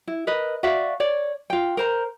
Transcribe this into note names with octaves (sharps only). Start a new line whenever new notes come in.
E4
A#4 B4 D#5
F#4 D5 E5 F5
C#5 D5
F4 G5
A#4 C5 A#5